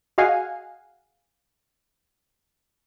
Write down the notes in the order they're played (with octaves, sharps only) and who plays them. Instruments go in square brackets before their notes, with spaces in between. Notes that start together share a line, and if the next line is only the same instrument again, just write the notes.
[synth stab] F#4 G#4 D#5 F5 F#5 G#5